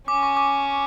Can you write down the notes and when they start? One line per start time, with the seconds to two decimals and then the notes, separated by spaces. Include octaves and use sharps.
0.08 C#4 D6
0.23 C#6
0.37 D6